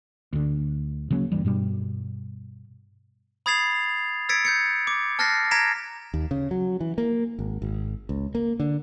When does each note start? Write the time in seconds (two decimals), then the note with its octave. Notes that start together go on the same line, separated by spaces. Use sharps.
0.33 D2 D3
1.10 C#3 F#3 A#3 C#4
1.32 D1 G2 E3 G3
1.44 G2 B2 G3
3.46 B5 D#6 G#6 A6 C7 F7
4.29 E6 G#6 A6 B6 C#7 D7
4.45 G6 G#6 C#7
4.87 D6
5.19 A5 F6 F#6 A6 A#6 C7
5.51 A#5 G#6 A#6 B6 D7 E7
6.14 D#2
6.31 C#3
6.51 F#3
6.80 E3
6.98 A#3
7.39 G#1
7.62 G#1
8.09 C#2
8.35 A#3
8.60 D3